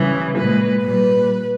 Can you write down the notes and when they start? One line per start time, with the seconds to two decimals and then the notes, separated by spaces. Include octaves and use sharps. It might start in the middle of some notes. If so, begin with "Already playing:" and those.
Already playing: C#3 E3 G3
0.37 A#2 G#3 B4
0.82 A#2 G3 B4